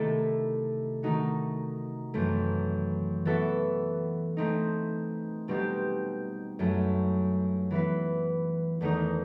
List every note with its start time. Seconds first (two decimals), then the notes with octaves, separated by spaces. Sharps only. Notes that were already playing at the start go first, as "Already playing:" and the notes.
Already playing: C3 D#3 A3 E4 A4
1.03 D#3 A3 D#4 F#4
2.14 F#2 E3 A3 C4
3.25 E3 B3 F#4 A4 E5
4.37 A3 C4 D#4
5.48 B2 G3 C4 D#4 G4
6.59 F#2 F#3 A3 E4
7.71 E3 B3 E4 B4
8.81 E2 D#3 A3 D#4